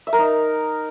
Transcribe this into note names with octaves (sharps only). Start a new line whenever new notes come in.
E5
A#4
D#4